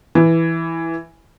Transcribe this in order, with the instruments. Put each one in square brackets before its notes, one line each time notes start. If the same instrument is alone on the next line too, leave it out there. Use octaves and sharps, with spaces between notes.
[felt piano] E3